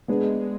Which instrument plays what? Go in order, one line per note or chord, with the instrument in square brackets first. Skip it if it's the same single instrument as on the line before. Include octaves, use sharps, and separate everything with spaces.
[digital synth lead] G#3 [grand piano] B3 D4 G#4